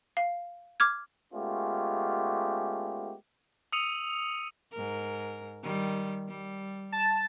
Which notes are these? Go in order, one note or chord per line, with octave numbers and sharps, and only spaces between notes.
F5
D6 F6 G#6
G#3 A3 B3 C#4 F4 G4
D#6 E6 C#7 D#7 F7
G#2 A#4
D#3 G3
G3
A5